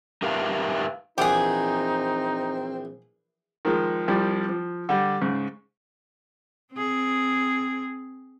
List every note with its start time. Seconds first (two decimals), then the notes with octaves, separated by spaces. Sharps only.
0.22 D#4 G4 A#4 B4 E5 F5
1.18 A#1 E3 C4 D#4 G4 G#4 F#5
3.65 D#3 F3 G#3
4.08 C2 F3 G3
4.49 F3
4.89 D3 G3
5.21 G#2 C#3
6.74 C4 G#4